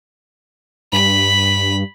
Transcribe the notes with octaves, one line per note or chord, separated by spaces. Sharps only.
G2 B5